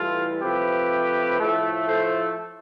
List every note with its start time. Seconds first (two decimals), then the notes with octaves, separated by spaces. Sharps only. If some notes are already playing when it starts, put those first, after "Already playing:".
Already playing: A2 E3 G3 F4 A4
0.42 C3 F3 A3 G4 B4
1.40 A2 F3 A3
1.88 A4 C5